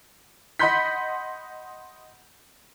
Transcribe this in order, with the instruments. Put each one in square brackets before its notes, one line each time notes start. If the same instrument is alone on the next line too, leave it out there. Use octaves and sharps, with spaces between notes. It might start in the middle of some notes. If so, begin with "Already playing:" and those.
[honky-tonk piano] D#5 F#5 B5 C6 G6 B6